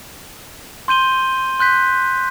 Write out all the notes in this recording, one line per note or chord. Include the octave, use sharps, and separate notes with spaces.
C6 G6 D#7 G7
C6 F#6 G6 B6